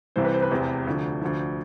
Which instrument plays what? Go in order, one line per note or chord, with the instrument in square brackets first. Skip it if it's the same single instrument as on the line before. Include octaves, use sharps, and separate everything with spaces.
[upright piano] C2 C3 E3 C5
B4
C5
B4
F1 E2 C3 C5
D2 D3 F3
D2 D3 F3